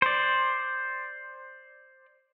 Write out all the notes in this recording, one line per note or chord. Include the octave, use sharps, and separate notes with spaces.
C5 D5